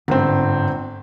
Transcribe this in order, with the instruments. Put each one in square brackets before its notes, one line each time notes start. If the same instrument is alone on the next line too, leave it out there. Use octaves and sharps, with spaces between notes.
[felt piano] G1 C4 [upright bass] G#2